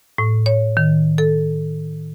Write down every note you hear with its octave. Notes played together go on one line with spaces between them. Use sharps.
A2
C#5
D#3
A4